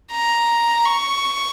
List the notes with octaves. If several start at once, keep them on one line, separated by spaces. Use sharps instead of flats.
A#5
C#6